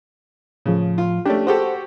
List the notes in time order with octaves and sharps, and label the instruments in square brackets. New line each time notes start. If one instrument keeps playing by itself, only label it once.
[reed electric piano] A2 F3 [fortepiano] C#3
[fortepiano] F4
[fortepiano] A3 C#4 D4 [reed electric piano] G4
[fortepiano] F#4 G4 A4 [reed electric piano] C5